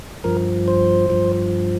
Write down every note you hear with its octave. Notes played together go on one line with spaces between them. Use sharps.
G2 F3 A#4
C5
G2 F3